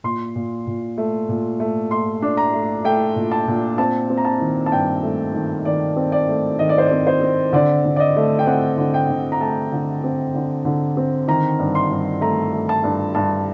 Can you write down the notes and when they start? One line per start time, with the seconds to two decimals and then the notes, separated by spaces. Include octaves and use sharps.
0.04 A#2 C6
0.35 A#2
0.67 A#2
0.98 A3
1.29 A#2
1.60 A3
1.91 A3 C6
2.22 D4
2.37 A#5
2.54 A3
2.84 A3 G5
3.16 A#2
3.31 A5
3.48 A#2
3.78 C4 A5
4.10 C4
4.17 A#5
4.25 A5
4.40 D#3
4.66 A5
4.72 G2 G5
5.03 A3
5.34 D#3
5.65 D#3 D5
5.97 C4
6.12 D5
6.29 A3
6.59 D#3 D#5
6.69 D5
6.78 C5
6.87 C4 D5
7.07 C5
7.21 C4
7.53 D3 D5
7.85 D3
7.96 D5
8.00 D#5
8.16 A3
8.39 G5
8.46 C4 F#5
8.78 D3
8.94 G5
9.09 D3
9.32 A#5
9.40 A3 A5
9.72 D3
10.04 C4
10.34 D3
10.65 D3
10.97 C4
11.28 D#3 A#5
11.59 G2
11.75 C6
11.90 G2
12.21 A3 A#5
12.53 A3
12.69 A5
12.84 G2
13.15 G2 A5